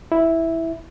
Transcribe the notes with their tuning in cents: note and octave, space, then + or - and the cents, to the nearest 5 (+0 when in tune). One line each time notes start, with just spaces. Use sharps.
E4 -5